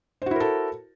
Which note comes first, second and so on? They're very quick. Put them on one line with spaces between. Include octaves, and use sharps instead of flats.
C5 F#4 E4 A#4 A4